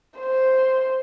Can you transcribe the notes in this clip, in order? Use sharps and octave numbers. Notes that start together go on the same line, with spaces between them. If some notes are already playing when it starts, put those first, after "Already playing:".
C5